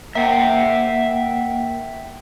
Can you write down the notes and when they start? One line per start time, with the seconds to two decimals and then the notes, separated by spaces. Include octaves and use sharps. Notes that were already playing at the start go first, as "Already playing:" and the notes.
0.15 A#3 A#4 E5 F#5 G5